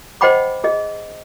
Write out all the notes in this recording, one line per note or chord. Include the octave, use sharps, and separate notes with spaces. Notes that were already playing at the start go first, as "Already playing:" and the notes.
C5 D#5 F#5 G5 B5 D6
G#4 D#5